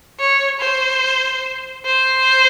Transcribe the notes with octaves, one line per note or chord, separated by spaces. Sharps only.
C#5
C5
C5